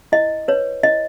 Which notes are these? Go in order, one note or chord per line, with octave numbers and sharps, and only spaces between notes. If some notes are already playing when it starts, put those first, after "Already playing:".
E4 D#5
B4 C#5
E4 D#5